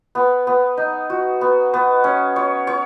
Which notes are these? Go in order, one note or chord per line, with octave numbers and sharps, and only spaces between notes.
B3
B3
D#4
F#4
B3
B3
C#4
C#5
C#5